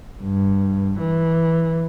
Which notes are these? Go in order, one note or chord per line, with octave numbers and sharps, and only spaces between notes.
G2
E3